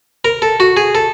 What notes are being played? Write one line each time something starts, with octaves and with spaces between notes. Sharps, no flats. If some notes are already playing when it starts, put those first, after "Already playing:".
A#4
A4
F#4
G#4
A4